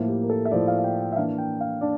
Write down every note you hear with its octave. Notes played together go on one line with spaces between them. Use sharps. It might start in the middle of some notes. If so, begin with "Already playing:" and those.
Already playing: A2 F3 A#3 E4
G4
A#4
A4
E5
A2 F3 A#3 E4 D5
F5
F5
G5
G5
E5
E3 A#3 D4 F5
G5
F5
D4 D5